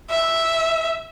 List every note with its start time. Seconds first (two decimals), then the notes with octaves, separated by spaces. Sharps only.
0.10 E5